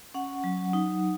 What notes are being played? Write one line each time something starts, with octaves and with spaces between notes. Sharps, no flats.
C#4 F#5
F#3
D#4